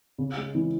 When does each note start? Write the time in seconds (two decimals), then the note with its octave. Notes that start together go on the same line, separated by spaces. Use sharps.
0.18 C#3
0.37 G#3
0.55 E3